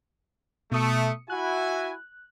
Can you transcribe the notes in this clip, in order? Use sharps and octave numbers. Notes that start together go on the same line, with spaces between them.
B2 A3 D#6 C#7
E4 F#4 G#5 F#6